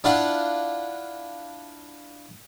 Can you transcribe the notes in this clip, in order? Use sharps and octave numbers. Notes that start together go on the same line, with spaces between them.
D4 E4 F4 D5 F5 F#5